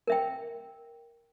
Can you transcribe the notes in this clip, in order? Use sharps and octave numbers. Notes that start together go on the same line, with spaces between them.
A#4 E5 G5